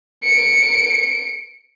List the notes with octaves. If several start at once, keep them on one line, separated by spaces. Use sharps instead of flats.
C#7 D7